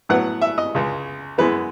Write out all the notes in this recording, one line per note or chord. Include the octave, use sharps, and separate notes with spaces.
A2 F#3 B3 F#5
E5
D#5
C#2 C#3 G#3
F#2 E3 G#3 B3 B4